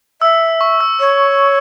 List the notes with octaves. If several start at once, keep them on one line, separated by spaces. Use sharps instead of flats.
E5 E6
C#6
E6
C#5